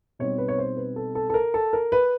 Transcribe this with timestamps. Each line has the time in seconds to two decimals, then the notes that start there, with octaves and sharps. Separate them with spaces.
0.19 B2 G3 C4 D#4 C#5
0.38 B4
0.48 C#5
0.58 C5
0.77 B4
0.96 A4
1.15 A4
1.30 A4
1.34 A#4
1.54 A4
1.73 A#4
1.92 B4